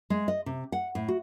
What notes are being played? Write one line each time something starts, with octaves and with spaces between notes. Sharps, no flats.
G#3
D#5
C3
F#5
A2
F#4